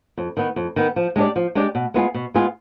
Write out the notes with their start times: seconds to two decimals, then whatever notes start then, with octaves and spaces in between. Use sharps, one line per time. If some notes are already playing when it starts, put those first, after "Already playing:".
0.18 F2
0.37 D#3 B3
0.56 F2
0.76 D#3 B3
0.96 F3
1.16 G#3 D4 G4 D5
1.36 F3
1.55 G#3 D4 G4 D5
1.75 B2
1.94 G#3 B3 F4 G#4
2.14 B2
2.34 G#3 B3 F4 G#4